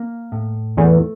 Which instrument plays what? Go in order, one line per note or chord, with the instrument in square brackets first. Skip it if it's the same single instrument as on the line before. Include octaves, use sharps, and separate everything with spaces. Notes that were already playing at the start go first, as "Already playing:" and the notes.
Already playing: [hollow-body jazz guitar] A#3
A2
[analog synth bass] E2 [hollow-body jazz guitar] A3